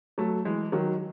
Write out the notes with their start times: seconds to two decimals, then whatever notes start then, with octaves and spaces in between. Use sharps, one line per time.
0.18 F#3 A3
0.45 E3 G#3
0.72 D#3 F#3